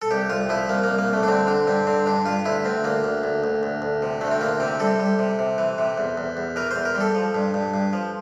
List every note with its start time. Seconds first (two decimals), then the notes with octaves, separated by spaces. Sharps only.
0.02 A4
0.11 C2 G4
0.30 C2 F4
0.49 F3 E4
0.69 C2 A#3
0.84 C2 A#3
0.98 A#3
1.09 C2 A3
1.23 D4
1.28 D3 C4
1.47 D3 D4
1.67 G2 C4
1.87 D3 C4
2.06 G2 D4
2.26 G2 F4
2.45 D2 E4
2.65 D2 C4
2.84 D2 A#3
3.04 D2
3.24 D2
3.44 D2
3.63 D2
3.82 D2
4.02 C3
4.21 D2 A3
4.31 C4
4.41 D2 A#3
4.60 C3 C4
4.80 G3 A4
4.99 G3
5.19 C3
5.39 C3
5.58 E3
5.78 C3
5.98 E2
6.18 E2
6.37 E2
6.56 E3 A#4
6.71 C5
6.76 E2
6.85 A#4
6.95 G3
7.01 A4
7.15 F3
7.35 G2
7.54 G2
7.74 G2
7.93 F3